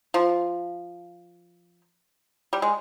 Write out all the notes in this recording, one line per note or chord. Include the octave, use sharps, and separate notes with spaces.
F3
G3
G#3